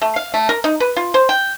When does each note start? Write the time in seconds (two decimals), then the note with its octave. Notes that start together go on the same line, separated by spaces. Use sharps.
0.02 A3
0.16 F5
0.34 A3
0.49 A#4
0.64 D#4
0.80 B4
0.97 F4
1.14 C5
1.29 G5